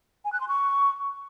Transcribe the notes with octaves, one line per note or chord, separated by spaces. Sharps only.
G#5
F#6
C6
C#6